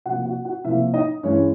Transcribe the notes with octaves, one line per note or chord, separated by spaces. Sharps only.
C3 F3 A#3 F#4 F#5
F#4 F#5
F#4 F#5
C3 F3 A#3 E4 E5
D#4 D#5
G2 E3 G#3 C#4 C#5